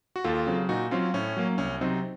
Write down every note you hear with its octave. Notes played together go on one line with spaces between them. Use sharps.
F#4
D#2 F4 A4
C#3 F#3 C4
A#2 D#4 F#4
F#3 C4 C#4 F4
A2 C#4
F#3 A#3
C2 C#4
C3 F#3 C4 D#4